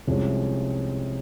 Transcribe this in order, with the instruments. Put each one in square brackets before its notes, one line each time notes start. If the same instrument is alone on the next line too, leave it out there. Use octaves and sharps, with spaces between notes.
[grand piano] C2 C3 F3 G#3 C#4